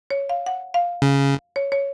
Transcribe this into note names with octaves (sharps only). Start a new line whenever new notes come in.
C#5
F5
F#5
F5
C#3
C#5
C#5